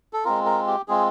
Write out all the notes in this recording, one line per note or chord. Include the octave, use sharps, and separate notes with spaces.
A4
G#3 C4 F4 A#4
A#4
G4
G#3 C4 F4 G#4